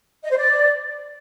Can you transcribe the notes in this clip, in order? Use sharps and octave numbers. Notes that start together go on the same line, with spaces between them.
D#5
C5
D5